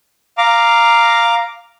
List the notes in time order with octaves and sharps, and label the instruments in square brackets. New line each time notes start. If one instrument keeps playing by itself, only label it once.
[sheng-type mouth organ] F5 A#5 D6